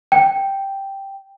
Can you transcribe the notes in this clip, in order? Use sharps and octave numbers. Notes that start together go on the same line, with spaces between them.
G5